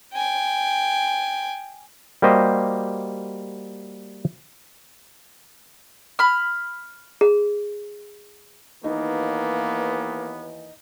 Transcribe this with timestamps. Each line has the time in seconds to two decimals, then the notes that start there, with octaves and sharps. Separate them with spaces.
0.14 G5 G#5
2.22 G3 A#3 F#4 G4 C5 D#5
6.19 B5 F6
7.21 G#4
8.84 D#2 E3 A#3 B3 D#4